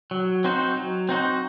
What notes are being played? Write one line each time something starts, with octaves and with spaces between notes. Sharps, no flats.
F#3
C4 D#4 F#4 C5
F#3
C4 D#4 F#4 C5